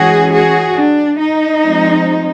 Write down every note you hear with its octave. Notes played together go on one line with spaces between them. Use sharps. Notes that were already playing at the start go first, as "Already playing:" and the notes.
Already playing: E3 G#3 C#4 F#4 G#4
F#4 G#4
D4
D#4
F3 G#3 C4